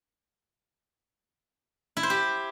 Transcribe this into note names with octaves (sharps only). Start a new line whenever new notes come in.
E4
C5
G4